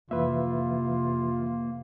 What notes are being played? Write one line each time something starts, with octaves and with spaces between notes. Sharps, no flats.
F2 C3 E3 A#3 F4 B4 E5